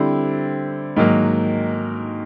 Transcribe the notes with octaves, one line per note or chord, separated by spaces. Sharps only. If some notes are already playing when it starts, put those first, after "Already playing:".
Already playing: D3 G3 C4 E4 G4
G#2 D#3 F#3 A#3